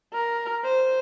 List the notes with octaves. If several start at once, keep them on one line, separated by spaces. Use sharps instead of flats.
A#4
C5